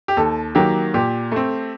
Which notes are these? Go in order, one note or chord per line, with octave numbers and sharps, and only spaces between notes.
G4
D#2 A4
D#3 F#3 A#3 G4
A#2 G4
A3 C4